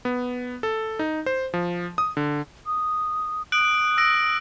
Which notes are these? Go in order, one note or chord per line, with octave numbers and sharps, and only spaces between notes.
B3
A4
D#4
C5
F3
D#6
D3
D#6
D#6 F#6 D7 F#7
E6 A#6 D7